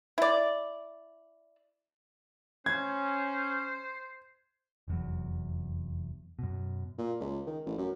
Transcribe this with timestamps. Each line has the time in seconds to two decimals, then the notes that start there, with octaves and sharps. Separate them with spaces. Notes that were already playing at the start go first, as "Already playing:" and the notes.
0.18 E4 D5
2.66 C#4 C5 G#6
4.88 F1 E2 F#3
6.39 F#2 B2
6.98 A#2
7.21 C#2
7.47 D#3
7.66 A1
7.78 F#2